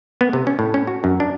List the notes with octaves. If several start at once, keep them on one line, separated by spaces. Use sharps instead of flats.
B3
C3
C#4
A2
C#4
F#4
F#2
D4